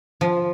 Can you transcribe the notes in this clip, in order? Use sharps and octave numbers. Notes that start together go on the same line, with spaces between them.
F3